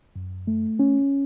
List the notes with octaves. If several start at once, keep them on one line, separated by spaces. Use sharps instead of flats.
F#2
A3
C#4